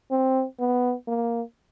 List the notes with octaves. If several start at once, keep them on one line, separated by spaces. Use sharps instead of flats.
C4
B3
A#3